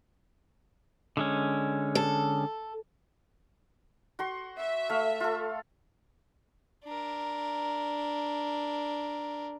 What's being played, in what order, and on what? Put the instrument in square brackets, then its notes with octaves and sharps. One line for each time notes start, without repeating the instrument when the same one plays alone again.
[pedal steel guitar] D3 G#3 C#4
[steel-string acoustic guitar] A4
[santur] F#4 C6 C#6
[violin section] E5
[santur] A3 F5
F4 A4
[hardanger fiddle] D4 A#4